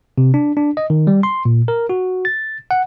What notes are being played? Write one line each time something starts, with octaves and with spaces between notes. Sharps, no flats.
C3
D4
D4
D#5
D#3
G3
C6
A#2
A#4
F#4
A6
F#5